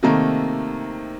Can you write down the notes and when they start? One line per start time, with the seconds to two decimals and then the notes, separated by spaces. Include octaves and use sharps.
0.03 C3 D#3 A3 A#3 A#5